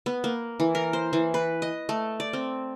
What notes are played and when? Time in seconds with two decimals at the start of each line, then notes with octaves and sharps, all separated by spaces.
0.06 B3
0.24 A#3
0.60 E3
0.75 A#4
0.93 C5
1.13 E3
1.34 B4
1.62 D#5
1.89 A3
2.20 D5
2.33 C4